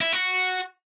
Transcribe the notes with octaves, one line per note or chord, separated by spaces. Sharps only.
E4
F#4